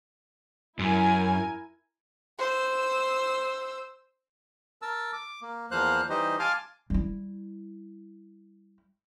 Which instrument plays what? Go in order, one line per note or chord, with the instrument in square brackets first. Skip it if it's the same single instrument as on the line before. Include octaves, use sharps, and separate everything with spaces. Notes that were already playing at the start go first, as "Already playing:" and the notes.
[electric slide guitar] F#2 [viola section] E4 A#4 G#5
[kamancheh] C5 E6
[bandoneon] A#4 A5 E6
D6
A#3
E2 F3 A#3 C5 F5 F#6
E3 G3 D#4 G4 C5 D#5
F5 G#5 A5 C6 D6 F6
[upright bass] G3 E4